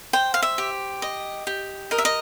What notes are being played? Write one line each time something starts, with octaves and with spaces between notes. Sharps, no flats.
C5 G5
F5
E5
G4
D#5
G4
A#4 D#5
E5
D#5